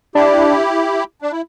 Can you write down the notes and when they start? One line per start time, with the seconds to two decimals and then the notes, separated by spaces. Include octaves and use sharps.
0.15 D4 E4 G4
1.22 D4
1.32 E4